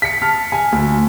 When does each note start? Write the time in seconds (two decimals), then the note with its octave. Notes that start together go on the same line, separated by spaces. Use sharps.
0.02 B6 C#7
0.22 A5 F6
0.52 G#5
0.72 D2